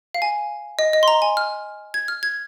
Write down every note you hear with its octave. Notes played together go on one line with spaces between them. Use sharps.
F5
G#5
D#5
D#5
C6
A#5
G#5
F6
G#6
F6
G#6